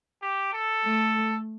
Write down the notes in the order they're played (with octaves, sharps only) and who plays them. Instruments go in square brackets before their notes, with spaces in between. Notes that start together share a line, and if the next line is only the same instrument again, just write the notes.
[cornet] G4
A4
[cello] A3